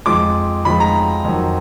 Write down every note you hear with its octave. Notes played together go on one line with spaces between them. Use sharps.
F2 F3 G#3 D6
F2 F3 G#3 B5
A#5
F2 D#3 F#3